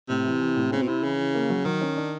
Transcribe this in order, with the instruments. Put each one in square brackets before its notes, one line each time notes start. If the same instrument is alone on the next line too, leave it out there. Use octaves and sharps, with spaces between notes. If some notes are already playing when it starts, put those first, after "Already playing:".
[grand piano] A2 [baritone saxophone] C3
[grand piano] E3
E3
A2
[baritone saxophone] C#3 [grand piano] C4
[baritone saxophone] B2
[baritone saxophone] C3 [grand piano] E4
[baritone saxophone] C#3 [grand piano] E3
[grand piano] E3
A#3
F#3
[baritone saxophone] D#3 [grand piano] F#3
[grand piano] C#4
D4